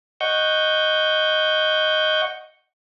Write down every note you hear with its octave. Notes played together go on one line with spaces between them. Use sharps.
D#5 F#5 C#6 G6